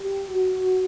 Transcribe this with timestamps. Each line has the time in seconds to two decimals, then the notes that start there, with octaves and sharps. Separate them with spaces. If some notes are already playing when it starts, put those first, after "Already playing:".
Already playing: G4
0.29 F#4